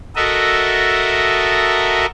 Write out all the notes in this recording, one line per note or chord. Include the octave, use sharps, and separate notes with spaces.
F#4 A4 A#4 D#5 E5